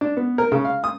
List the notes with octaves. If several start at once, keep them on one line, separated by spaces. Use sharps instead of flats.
D4
B3
A#4
C#3
F5
D#6